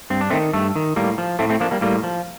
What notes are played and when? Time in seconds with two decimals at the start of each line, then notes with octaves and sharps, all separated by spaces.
0.10 G2 C4
0.21 D4
0.30 D#3 A3 C4
0.53 G2 A3
0.76 D#3
0.96 A2 G3 A#3
1.18 F3
1.39 A2 A3 C4
1.49 A3 C4
1.60 F3 A#3 D4
1.71 G3 A#3
1.81 A2 G3 A#3
2.04 F3